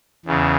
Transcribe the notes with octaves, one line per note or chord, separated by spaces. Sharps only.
E2 C#3